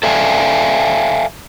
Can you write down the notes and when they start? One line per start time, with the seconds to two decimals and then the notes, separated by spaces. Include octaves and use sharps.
0.03 A4 D5 E5 F5 G#5